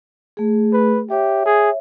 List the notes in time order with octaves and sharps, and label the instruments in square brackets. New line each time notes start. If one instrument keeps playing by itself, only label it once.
[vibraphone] A3 G#4
[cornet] B4
[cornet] G4 [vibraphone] C#5 E5
[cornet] G#4